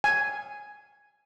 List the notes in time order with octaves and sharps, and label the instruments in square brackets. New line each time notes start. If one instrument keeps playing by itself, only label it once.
[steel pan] G#5